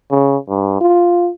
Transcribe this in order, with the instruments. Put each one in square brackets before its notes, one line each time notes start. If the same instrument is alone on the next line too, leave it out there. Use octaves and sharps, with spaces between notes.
[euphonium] C#3
G2
F4